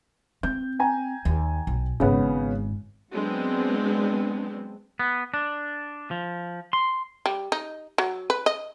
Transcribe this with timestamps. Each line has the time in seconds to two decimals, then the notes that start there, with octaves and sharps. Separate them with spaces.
0.43 C4 G6
0.79 G5 G#5 A#5
1.25 D#2
1.67 B1
2.00 G#1 G#2 C#3 B3
3.11 F#3 G#3 B3 C4 D4
4.99 B3
5.34 D4
6.11 F3
6.73 C6
7.26 G3
7.52 D#4
7.98 F#3
8.30 B4
8.46 D#5